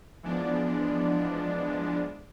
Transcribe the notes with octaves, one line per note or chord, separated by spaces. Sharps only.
E3 F3 G#3 B3 D4